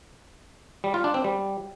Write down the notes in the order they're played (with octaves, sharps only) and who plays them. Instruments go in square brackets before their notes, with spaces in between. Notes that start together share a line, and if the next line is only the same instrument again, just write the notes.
[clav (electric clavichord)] G3
F4
D4
C4
G3